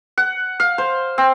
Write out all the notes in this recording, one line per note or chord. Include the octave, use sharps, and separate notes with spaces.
F#5
F5
C5
C4